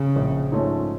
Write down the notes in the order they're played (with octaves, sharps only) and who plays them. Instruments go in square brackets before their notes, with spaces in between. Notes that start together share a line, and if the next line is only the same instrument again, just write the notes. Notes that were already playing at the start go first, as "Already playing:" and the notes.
Already playing: [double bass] C#3
[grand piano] A#1
G#2 F3 A3 C#4